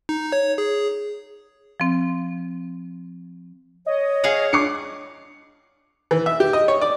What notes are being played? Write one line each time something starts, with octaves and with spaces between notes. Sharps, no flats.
D#4
C#5
G#4
F3 C4
C#5 D#5
G#4 F5 F#5
D4 D6 C7 C#7
E3
E5
G4
D#5
C#5
D5